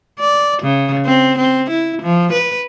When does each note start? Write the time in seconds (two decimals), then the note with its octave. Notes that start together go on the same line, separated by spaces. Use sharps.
0.20 D5
0.63 C#3
1.05 C4
1.38 C4
1.70 E4
2.02 F3
2.33 B4